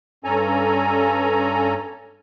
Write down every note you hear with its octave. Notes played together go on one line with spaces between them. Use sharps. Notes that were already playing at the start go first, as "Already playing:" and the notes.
G2 C#4 A4 G#5 A#5